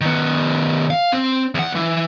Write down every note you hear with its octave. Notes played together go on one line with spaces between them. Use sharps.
D#3 B3
F5
C4
E2 F#5
E3